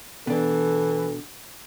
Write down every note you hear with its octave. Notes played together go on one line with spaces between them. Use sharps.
B2 E3 D4 A4